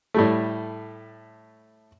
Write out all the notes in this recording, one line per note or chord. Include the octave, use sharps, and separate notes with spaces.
A2 G3 A3